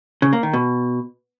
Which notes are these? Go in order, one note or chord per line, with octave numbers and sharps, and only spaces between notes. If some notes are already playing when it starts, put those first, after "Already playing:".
C#3
A#3
D#3
B2